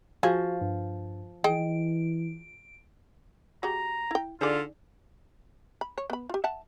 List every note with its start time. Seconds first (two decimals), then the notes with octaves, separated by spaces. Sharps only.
0.23 F3 F#4 G#4
0.61 G2
1.44 E3 G#4 D#5 G5 D7
3.63 G#3 F#4 G4 A#5
4.11 E4 G5
4.41 D3 D#4 F4 G#4 D5
5.81 B5
5.98 C#5
6.10 B3 B5
6.29 F4 G4
6.44 E5 F#5 A5